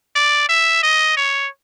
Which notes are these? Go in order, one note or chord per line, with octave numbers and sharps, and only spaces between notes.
D5
E5
D#5
C#5